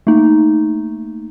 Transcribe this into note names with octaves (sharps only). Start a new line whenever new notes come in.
A3 A#3 D#4